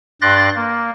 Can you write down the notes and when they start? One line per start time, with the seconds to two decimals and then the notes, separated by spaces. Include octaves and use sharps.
0.21 G2 D5 C6 F#6 A6 A#6
0.56 A#3